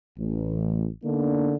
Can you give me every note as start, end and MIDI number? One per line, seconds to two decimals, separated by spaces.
0.19 0.87 33
1.04 1.55 50
1.04 1.55 58
1.04 1.55 59
1.04 1.55 62
1.04 1.55 63